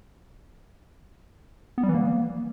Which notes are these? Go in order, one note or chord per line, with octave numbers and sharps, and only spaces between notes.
B3
G3
E3
A#3